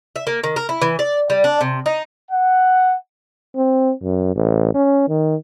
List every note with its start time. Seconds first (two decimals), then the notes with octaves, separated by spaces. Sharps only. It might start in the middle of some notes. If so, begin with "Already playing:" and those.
0.16 E5
0.27 A#3
0.44 D#3
0.56 A#4
0.69 E4
0.82 E3
0.99 D5
1.30 G3
1.44 D4
1.61 C3
1.86 D#4
2.31 F#5
3.56 C4
4.03 F#2
4.35 A1
4.74 C#4
5.08 D#3